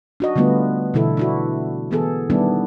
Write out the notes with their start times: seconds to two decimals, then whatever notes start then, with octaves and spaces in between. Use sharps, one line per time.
0.20 D4 F#4 D#5
0.36 D3 G3 A3 B3 F4
0.94 B2 D3 E3 E4 A4
1.17 D4 E4 F#4
1.91 E3 B3 G#4 A4
2.30 D#3 G3 B3 D4 E4